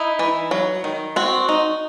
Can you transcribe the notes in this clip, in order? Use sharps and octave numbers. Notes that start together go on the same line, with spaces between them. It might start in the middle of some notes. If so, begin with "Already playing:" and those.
Already playing: D#4 E4
E3
F#3
D#3
C4 F#4
D#4